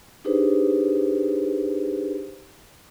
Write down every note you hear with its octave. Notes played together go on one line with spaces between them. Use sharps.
D4 D#4 G4 G#4 B4 C5